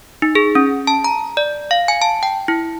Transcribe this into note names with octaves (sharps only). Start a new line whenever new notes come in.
D#4
G#4
C#4
A5
A#5
D5
F5
G#5
A5
G5
E4